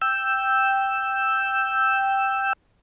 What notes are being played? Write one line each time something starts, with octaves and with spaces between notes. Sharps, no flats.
G5 E6